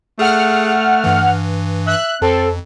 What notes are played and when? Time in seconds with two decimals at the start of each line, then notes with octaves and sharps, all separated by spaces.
0.19 A3 G#4 F#5 F6
1.04 G2 E3
1.87 E5 F#6
2.22 F2 C4 A4